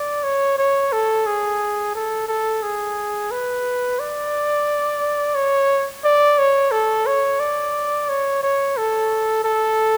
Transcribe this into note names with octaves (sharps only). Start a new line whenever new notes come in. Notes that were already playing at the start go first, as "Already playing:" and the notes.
Already playing: D5
C#5
C#5
A4
G#4
A4
A4
G#4
B4
D5
C#5
D5
C#5
A4
C#5
D5
C#5
C#5
A4
A4